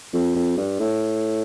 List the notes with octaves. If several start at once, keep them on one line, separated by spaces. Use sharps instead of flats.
F2
F2
G2
A2